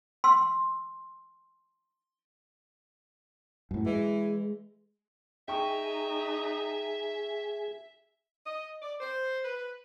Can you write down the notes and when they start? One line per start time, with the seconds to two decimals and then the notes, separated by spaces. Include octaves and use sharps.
0.24 C6 E6
3.71 F#2 A2
3.86 E3 G#3
5.48 D#4 G#4 E5 G5 C#6
8.46 D#5
8.82 D5
9.01 C5
9.45 B4